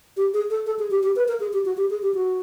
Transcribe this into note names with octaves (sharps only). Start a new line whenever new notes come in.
G4
G#4
A4
A4
G#4
G4
G4
B4
A#4
G#4
G4
F#4
G4
G#4
G4
F#4